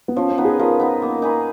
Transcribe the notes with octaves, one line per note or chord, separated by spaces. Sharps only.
B3
F3 C#4
C#4
B3 D#4
G#4
F3 A#4
B3 D#4
A#3
D#4 G#4 B4